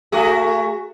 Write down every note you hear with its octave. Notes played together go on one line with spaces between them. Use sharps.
A3 F#4 G#4